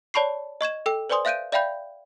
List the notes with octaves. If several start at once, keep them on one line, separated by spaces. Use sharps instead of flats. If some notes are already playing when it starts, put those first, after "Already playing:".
C#5 D5 A5 B5 C#6 C7
D#5 C#6 G#6 E7
A4 G5 E6
B4 C5 D5 G#5 C6 D#6
E5 F5 F#6 G6 D7 D#7
D5 E5 F5 G5 B5 G6